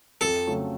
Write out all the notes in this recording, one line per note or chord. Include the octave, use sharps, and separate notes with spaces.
F2 A4
C#3 F#3 A3